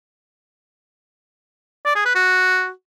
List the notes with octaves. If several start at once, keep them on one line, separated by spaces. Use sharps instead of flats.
D5
G#4
B4
F#4